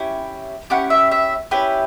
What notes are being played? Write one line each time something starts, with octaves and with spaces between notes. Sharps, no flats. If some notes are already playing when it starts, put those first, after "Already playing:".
Already playing: C#4 E4 G4
C#4 E4 G4 F#5
E5
E5
C#4 E4 G4 B4